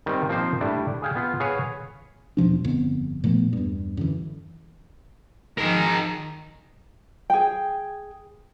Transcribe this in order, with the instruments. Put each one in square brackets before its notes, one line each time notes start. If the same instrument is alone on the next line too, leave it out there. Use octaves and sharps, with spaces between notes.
[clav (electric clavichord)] D#3 G3 C4
F3 A#3 C4 D#4 C5
G3 A3 D4 E4
G#4 F5 G5
B3 F4 F5
G#4 B4 C#5 F5 F#5
[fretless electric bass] E2 B2 F3 D4
G1 F2 D3 B3
A#2 F3 A3 B3
E2 G2
F#2 D3 E3
[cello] D#3 F3 [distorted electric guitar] G#4 A#4
[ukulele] G#4 G5